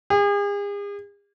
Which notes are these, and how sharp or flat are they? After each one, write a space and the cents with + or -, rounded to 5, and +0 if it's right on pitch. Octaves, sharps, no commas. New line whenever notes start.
G#4 -40